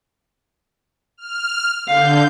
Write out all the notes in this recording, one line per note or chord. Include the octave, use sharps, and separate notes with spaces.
F6
D3 F5 G6